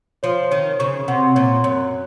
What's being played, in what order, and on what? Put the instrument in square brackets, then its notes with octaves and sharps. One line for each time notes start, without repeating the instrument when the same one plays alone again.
[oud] F3 [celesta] C#5
[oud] D#3 [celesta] C#5
[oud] C#3 [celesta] C#6
[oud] C3 [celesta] F#5
[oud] A#2 [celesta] C#5
[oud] F#2 [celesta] C#5